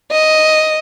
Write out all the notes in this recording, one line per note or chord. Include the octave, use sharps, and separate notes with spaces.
D#5